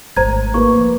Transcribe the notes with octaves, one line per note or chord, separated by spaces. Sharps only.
G#1 A3 C5 A#5 G#6
A#3 B4 C#6
F3